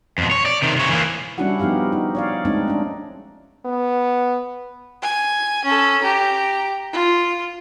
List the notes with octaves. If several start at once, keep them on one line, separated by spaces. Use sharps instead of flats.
F2 B2
C#5
D5
C3 D#3
C3 C#5
E3 A#3
G3 C#4 D4 E4 F#4 F#5
F3 B3 D#4 G4 F5
D#4
C#5 D5 F5
G#3 A3 C4 D4 D#4
C#4 D4
B3
G#5
C#4 A4
G4 A#5
F4